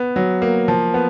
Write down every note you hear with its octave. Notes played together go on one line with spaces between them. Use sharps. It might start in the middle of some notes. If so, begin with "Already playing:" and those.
Already playing: B3
F#3
A#3
F3
B3